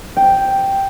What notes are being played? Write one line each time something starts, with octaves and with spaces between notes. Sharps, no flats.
G5